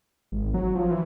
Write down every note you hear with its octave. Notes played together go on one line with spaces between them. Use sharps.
G#1
F#3
F3
E3